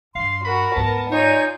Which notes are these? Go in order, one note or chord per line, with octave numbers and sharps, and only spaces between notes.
G2 F5 C6
F#4 A#4 B5
D2 G#2 B3 A5
D#4 F4 C#5 D5 G#5 G6